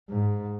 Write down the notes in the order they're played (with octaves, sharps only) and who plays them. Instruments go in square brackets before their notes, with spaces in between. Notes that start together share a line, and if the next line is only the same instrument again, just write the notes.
[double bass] G#2